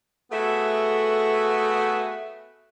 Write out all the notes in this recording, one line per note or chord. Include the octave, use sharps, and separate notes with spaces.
A3 B3 F#4 G#4 E5